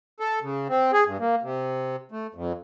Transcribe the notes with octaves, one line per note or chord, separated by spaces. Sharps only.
A4
C#3
C4
G#4
G2
A#3
C3
A3
F2